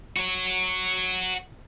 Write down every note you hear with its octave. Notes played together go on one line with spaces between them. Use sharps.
F#4 C#5